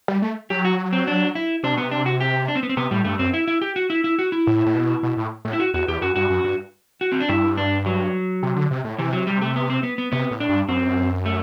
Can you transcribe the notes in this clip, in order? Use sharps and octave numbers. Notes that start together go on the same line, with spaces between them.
G3
A3
F#3 G4
F#4
C4
D4
E4
C3 D4
B2
C3 B3
D4
F#4
G4
D4
C4
B3
C4
C3 B3
A2 G3
G2 A3
F#2 C4
E4
E4
G4
F#4
E4
E4
F#4
E4
A2
A2
B2
B2
A2
A2
E4
F#4
E2 F#4
E2 G4
F#2 F#4
G2 F#4
F#2
G2
F#4
C4
D4
G2 E4
D4
F#3
C3
D3
C3
A2
C3 E3
F#3
G3
A3
B3
C4
B3
B3
C3 B3
A2
D4
G2
F#2 C4
A3